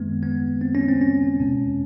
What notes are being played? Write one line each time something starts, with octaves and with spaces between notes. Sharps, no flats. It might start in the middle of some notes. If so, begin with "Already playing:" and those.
Already playing: F#2 D#3 G#3 B3
B3
C4
C#4
C4
C#4
E2 B2 G#3